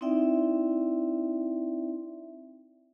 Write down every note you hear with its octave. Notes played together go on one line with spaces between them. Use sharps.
C4 D#4 E4 D5 E5 G5